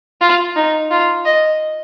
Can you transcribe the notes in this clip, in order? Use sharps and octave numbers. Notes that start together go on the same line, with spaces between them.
F4
D#4
F4
D#5